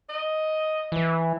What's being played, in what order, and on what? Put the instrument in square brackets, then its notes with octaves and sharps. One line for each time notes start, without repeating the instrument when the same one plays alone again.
[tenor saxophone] D#5
[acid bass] E3